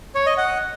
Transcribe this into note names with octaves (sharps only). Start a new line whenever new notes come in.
C#5
D#5
F#5